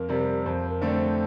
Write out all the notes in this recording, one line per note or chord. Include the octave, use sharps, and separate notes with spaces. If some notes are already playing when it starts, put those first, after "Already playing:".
Already playing: F2 A#4
C3 G3
F2 C5
A#4
D3 A3 C4 D5
C5